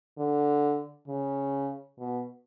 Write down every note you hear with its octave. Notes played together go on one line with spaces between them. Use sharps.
D3
C#3
B2